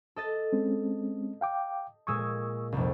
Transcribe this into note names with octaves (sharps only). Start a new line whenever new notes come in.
A4 D#5 A6
G#3 C4 C#4
F5 G5 D6
A#2 G#3 C#6 D#6 E6 G#6
F1 C2